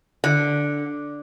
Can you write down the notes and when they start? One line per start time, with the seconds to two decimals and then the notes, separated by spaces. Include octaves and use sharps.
0.24 D3